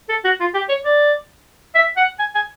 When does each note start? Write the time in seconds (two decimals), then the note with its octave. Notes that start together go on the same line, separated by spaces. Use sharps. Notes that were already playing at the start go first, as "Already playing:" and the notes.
0.09 A4
0.25 F#4
0.40 F4
0.54 G4
0.69 C#5
0.85 D5
1.75 E5
1.97 F#5
2.19 G#5
2.35 G#5